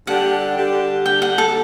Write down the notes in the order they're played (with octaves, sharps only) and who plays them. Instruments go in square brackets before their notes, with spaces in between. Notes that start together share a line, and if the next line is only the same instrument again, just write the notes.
[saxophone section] D3 G3 D4 G4 [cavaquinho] F#5
[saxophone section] D3 G3 D4 G4
[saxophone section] D3 G3 D4 G4 [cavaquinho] G5
[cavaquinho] F#5
A4